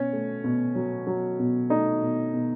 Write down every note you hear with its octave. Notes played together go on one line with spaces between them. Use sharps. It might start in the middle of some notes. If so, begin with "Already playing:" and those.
Already playing: B2 C#4
A3
B2
F#3
F#3
B2
A3 D#4
B2
B2